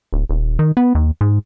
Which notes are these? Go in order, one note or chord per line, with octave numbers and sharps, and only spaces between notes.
D1
D#1
D#3
B3
D#2
G#2